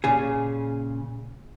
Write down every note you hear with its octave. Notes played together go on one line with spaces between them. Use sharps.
A#2 C#3 G#4